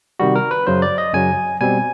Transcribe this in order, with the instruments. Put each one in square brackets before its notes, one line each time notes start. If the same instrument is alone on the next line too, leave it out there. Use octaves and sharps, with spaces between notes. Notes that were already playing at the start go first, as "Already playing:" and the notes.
[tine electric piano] C3 D#3 G3 F#4
A#4
B4
F#2 C#3 F#3 C5
D5
D#5
F#2 C#3 F#3 G#5
B2 G3 C4 G#5